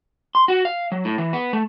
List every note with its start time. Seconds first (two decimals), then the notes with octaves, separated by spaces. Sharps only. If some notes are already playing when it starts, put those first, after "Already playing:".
0.35 C6
0.48 F#4
0.65 F5
0.92 F#3
1.05 A2
1.18 E3
1.33 B3
1.53 A3